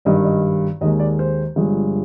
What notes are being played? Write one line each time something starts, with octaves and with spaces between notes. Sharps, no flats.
G#1 G2 D#3 G3 D#5
D#5
D#2 D#3 G#3 D#5
D5
C5
G1 G2 F3 G#3